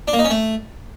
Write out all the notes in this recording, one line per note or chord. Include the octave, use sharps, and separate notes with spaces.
D4
A#3
D#4
C#4
A3